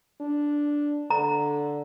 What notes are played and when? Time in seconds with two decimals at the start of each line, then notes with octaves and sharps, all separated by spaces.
0.21 D4
1.10 D3 A#5